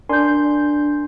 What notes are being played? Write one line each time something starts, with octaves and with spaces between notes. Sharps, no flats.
D4 A#4 G#5 C6 G6